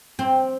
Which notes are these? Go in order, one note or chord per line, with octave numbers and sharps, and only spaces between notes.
C4